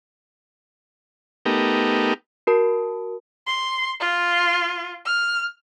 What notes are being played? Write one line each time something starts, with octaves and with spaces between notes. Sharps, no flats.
A3 B3 D#4 G4 A#4
F#4 A#4 A5
C6
F4
F6